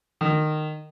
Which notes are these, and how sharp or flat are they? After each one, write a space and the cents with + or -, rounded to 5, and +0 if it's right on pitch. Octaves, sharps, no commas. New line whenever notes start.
D#3 -20